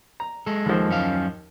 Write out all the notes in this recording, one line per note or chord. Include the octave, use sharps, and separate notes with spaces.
A#5
G#3 A4
D#2 F3
F#2 C#4 F5